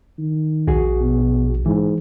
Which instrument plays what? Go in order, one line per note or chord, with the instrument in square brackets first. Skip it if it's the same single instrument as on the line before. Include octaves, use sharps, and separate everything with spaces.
[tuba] D#3
[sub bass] A#1 [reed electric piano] F#4 G#4
[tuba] B2
[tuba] G#2 [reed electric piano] E3